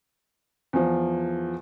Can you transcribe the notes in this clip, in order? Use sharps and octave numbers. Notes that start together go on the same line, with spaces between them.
E2 F3